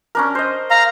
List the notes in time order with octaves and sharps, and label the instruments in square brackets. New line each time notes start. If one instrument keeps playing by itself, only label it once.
[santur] C#4 D4 A#4
C5 D#5
[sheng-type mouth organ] F5 A#5